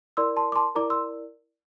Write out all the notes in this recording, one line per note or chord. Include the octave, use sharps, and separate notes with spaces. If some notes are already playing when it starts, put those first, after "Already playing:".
E4 A#4 D5 C6 E6
A5 C6
D6
A5 C6
E4 A#4 D5 A#5 D6
C6 E6